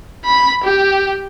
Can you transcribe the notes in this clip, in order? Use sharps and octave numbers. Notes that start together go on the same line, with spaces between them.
B5
G4